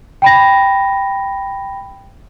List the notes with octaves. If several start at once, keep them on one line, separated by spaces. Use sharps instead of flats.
G5 B5 A#6